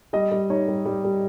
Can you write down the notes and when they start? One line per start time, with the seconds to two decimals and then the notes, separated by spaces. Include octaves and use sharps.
0.13 G3 D#5
0.31 G3
0.50 D#4 C#5
0.68 G3
0.85 G3
1.04 G3